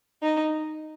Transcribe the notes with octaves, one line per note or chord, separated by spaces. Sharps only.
D#4